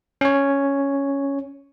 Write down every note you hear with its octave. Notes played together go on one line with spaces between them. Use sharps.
C#4 C#5